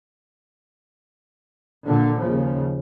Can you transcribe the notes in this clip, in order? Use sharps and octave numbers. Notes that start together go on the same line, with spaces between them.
A#2 D3
D#2 C#3 F3